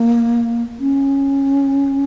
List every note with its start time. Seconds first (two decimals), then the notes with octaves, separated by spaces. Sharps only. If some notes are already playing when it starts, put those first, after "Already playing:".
Already playing: A#3
0.80 C#4